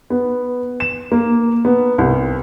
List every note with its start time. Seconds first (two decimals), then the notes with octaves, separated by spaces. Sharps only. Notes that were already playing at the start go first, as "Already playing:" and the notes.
0.10 B3
0.80 E7
1.12 A#3
1.65 B3
1.98 C2